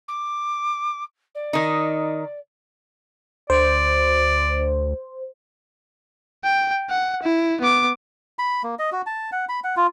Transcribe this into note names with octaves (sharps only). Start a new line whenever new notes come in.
D6
D5
D#3 D#4
D2 C5 D5
G5
F#5
E4
B3 D6
B5
A#3
D#5
F#4
A5
F#5
B5
F#5
F4